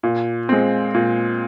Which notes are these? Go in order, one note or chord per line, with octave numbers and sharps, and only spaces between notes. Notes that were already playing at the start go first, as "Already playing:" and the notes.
A#2
G#3 C4
A#2